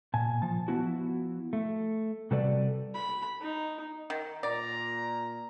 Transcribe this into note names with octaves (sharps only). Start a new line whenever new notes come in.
A#2 G#5 A5
F3 A5
F3 B3 E4 F#4
A3
C3 G3 F#4 A4 B4 D5
B5
D#4
D#3
A#2 D5 A#5